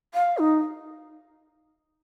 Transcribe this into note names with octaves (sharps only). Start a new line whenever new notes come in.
F5
D#4